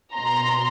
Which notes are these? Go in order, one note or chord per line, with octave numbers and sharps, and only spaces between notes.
B2 A#5 C6